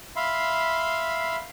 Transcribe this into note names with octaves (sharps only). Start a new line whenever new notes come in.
E5 F5 B5 C6